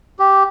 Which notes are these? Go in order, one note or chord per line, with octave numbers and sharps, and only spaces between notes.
G4